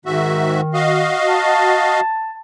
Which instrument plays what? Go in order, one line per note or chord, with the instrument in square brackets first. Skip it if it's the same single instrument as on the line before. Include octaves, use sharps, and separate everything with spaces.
[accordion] G#2 F#4 E5 [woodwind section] D#3
[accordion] F#4 D#5 F5
[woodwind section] A5